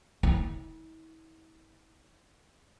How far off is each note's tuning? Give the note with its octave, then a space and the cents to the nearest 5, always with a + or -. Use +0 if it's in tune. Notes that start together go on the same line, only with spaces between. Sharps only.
E4 -40